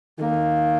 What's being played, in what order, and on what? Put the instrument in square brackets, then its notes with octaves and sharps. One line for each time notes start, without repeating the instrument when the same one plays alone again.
[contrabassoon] D#3 [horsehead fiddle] A#3